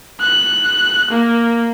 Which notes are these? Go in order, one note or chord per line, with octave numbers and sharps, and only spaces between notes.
F#6
A#3